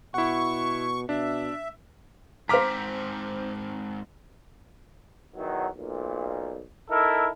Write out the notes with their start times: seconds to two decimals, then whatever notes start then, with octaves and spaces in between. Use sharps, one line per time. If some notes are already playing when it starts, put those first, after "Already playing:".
0.14 B2 E4 F#5 C#6
1.09 B2 D4 E5
2.49 G#2 C4 C5 A#5 D6 F6 B6
5.36 E2 D#3 F#3
5.76 B1 A#2
6.90 D#4 E4 A4 A#4